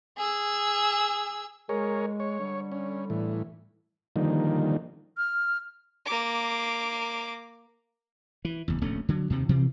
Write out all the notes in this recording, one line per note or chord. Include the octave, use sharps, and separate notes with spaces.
G#4 E6
G#3 G#4 A#4 C#5
C#5
D3 G3
C#4
A2 E3
D3 D#3 F3 G3 A#3 D#4
F6
A#3 D6
E3
F#1 E2
D1 A#1 A3 C#4
D3 F#3
D#2 C3 D#3
B2 E3 F3 C4